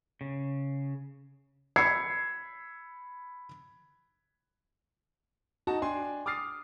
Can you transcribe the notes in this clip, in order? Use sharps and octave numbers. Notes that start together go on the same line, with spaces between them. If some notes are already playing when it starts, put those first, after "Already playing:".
C#3
B5 E6 G#6 C7 C#7
D#4 F#4 A5
D4 G5 G#5 C6
D6 D#6 F6 A6 C7